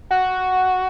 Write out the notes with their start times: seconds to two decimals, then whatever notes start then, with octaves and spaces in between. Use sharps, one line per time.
0.11 F#4